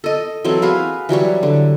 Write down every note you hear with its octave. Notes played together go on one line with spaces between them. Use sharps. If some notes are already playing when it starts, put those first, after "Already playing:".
A4 D#5
E3 F#3 C4 A4
F#4 G#4 B4 F5
E3 F#3 G3 C#5
D3